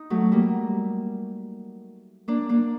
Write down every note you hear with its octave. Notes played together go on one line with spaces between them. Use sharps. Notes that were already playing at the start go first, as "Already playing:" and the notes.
Already playing: D#4
F#3 A3
G3 A#3
A#3 D4
A#3 D4